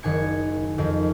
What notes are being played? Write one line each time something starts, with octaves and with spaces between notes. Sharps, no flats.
F#1 D#3 G#5 G#6 C#7
F2 D#3